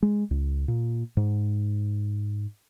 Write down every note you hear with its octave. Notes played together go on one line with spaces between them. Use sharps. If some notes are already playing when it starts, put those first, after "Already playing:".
G#3
C#2
A#2
G#2